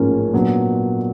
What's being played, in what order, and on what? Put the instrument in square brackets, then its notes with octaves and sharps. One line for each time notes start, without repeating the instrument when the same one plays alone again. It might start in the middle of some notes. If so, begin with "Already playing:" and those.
Already playing: [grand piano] A1 G#2 F3 A#3 C#4
A#2 F#3 B3 D4